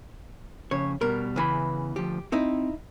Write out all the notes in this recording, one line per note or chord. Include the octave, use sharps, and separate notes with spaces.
F2 C#3 C#5
B2 G3 A#4
E2 C#3 E3 B5
D2 F3 G4
C4 D#4 E4